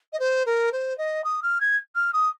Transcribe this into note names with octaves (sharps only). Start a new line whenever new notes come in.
D#5
C5
A#4
C5
D#5
D#6
F6
G#6
F6
D#6